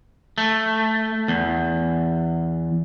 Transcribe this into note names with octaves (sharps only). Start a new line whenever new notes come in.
A3
E2